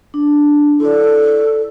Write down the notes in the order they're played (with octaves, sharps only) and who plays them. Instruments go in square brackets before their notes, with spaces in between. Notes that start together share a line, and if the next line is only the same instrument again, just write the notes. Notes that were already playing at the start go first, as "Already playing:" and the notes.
[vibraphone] D4
[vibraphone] E4 D5 [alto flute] A4